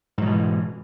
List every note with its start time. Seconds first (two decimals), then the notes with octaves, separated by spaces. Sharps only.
0.18 G#2
0.22 F#3
0.25 B2
0.29 E3